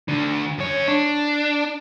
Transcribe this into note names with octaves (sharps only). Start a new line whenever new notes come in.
D2 D3
F#2 C#5
D4